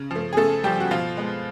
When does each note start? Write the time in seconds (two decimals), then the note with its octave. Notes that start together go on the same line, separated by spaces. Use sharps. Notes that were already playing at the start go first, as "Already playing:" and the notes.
Already playing: C#3
0.11 F3
0.16 A3
0.33 G#4
0.37 C#3 A3 A4
0.64 F3 G3 A3 G4
0.80 F#4
0.91 B2 F3 F4
1.17 G#3 B3